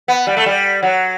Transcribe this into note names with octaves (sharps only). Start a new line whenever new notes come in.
B3
G3
A3
G3
F#3